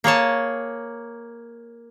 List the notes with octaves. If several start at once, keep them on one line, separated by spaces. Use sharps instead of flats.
A#3 G#4 C#5 A5